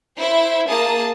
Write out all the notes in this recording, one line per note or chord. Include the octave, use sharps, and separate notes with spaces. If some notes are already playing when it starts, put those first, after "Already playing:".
E4 C5 E5
A#3 G#4 A5 D#6